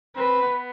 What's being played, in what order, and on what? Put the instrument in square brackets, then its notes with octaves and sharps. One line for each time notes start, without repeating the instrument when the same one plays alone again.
[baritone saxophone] C4 [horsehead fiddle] B4
[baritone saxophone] B3